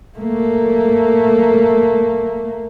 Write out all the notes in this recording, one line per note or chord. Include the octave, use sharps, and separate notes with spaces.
A3 A#3